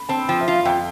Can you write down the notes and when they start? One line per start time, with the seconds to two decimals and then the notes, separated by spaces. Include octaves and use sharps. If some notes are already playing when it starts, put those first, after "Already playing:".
Already playing: B5
0.09 C4 A5
0.28 F3 G5
0.41 E5
0.48 F4
0.53 F5
0.65 F2 G5